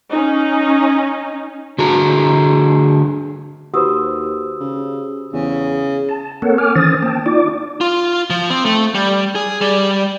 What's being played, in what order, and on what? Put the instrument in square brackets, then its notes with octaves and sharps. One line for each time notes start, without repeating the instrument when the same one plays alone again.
[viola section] C#4 D#4
[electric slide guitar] D3 F#4 G#4 A#5
[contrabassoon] D#2 [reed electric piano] F#4 B4 C5 [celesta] G4 D#6 E6
[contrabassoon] C#3
[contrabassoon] E2 [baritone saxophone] C#3
[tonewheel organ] A5
A#3 C4 A4 A#4 C#5 F#5
G#5 D6 F6
D#3 E3 C#4 C5 D#6 A6
A#3 G5 A5
D#4 F4 D5 D6
[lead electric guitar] F4
F3
C4
A3
G3
G#4
G3